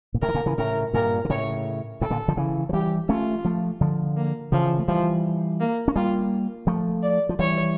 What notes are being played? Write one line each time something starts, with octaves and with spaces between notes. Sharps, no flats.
A#2
A2 C#3 A#4
E3
A#2 D3
C#3 E3
A2 C#3 A#4
G2 A#2 A#4
D3
A2 C#3 C#5
A2 C#3 A4
A#2 D3
D3 F3
C#3 E3
F3
E3 G3 G4
A3 C#4 F4
F3 A3
D3 F3
A#3
C#3 E3 F3
A3
E3 F3 G3
A#3
C#4
G3 A#3 F4
F3 A3
D5
F3
E3 G3 C#5